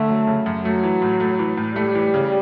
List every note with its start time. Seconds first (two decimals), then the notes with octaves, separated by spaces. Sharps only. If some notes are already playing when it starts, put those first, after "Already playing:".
Already playing: D3 A3
0.09 F#3
0.27 C#3
0.46 F#2
0.65 F#3 A3
0.84 E3
1.02 A2
1.20 A3
1.39 E3
1.57 A2
1.76 G3 A3
1.95 E3
2.14 C#3